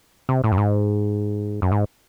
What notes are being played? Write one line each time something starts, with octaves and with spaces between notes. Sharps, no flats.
C3
A2
F#2
G#2
F#2
G#2